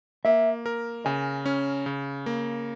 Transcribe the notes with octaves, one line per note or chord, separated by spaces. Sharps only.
A#3 E5
A#4
C#3 G#5
C#4
C#3
A#3